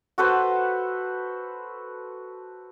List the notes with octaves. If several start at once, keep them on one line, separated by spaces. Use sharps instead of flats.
F#4 A4 B4 C5